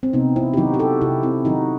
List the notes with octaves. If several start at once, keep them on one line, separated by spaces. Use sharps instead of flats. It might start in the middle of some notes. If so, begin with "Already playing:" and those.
C4
C3 B3 D#4
C4 E4
G4
D#3 F#3 D#4 F#4
G4
F#4 A4
C3 E4 G4
C4 E4
D#3 F#3 D#4 F#4